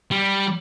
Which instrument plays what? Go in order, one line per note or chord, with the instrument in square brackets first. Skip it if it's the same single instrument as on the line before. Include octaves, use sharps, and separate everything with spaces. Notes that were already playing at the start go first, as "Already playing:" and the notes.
[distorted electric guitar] G3